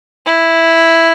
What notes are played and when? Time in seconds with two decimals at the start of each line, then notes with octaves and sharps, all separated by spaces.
0.26 E4